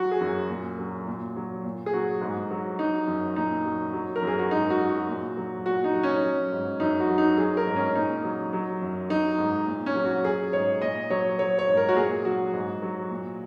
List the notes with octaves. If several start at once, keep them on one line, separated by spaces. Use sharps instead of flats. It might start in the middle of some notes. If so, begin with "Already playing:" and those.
Already playing: F#3 F#4
G#4
F#2
A#2
F#3
A#2
F#3
A#2
G#4
F#3 F#4
G#2
F#3
F#3 D#4
F#2
A#2 D#4
F#3
F#3
A#4
F#2
G#4
F#4
G#2 D#4
F#4
F#3
F#4
A#2
F#3
A#2 F#4
D#4
F#3
C#4
F#3
G#2
F#2 D#4
F#4
F#3
D#4
F#3 G#4
A#4
G#2
C#4
A#2 D#4
F#3
F#3
F#2
F#3 D#4
G#2
A#2
C#4
F#3
F#4
F#3 G#4
G#2 C#5
A#2 D#5
F#3 C#5
F#3 C#5
C#5
G#2
A#4
F#4
A#2 G#4
F#3 F#4
G#2
F#3
A#2